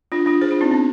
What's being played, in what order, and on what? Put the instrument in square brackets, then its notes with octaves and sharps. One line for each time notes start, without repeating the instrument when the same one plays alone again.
[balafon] D4 F4
D4 F4
G#4 C5
D4 F4
C4 D#4
B3 D4